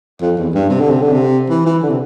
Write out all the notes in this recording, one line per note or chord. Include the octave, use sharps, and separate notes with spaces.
F2
E2
G2
C3
D3
C3
D3
C3
E3
E3
D3
C3